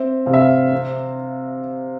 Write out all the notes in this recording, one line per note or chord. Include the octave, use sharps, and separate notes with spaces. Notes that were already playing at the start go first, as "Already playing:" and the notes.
Already playing: C4 E5
C3 F5
E5
F5
C4